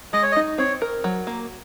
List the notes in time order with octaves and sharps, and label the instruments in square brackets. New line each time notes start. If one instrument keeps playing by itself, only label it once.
[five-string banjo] G#3 [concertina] D#5
[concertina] C#5
D#5
[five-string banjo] D#4
[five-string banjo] C4 [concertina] C#5
[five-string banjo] A#4
F#3
A#3